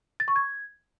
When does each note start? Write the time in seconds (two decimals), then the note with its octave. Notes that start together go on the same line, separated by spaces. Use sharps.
0.20 A6
0.28 C#6
0.36 G#6